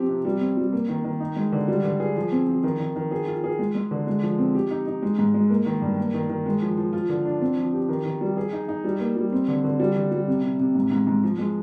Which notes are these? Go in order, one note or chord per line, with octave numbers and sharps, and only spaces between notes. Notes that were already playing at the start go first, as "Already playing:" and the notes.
Already playing: F3 C4 G4
C3
G3
C4
G3
A#3
D#3
D#3
D#4
G#3
D3
G3
D3
G#4
F3
C4
F3
D#3
D#3
D#3
G#4
F4
G#4
G#3
G#3
D3
G#3
F3
C4
G4
D#4
D#4
G#3
G#2
G#3
A#3
D#3
G2
A#3
D#3
D#3
G#3
F3
F3
F4
D3
D4
C4
F3
G4
D#3
D#3
G3
G#4
D#4
D#4
G3
A#3
G3
C4
D3
D3
G3
D3
G3
C3
C3
C3
G#2
G#2
G#2
F3
G#3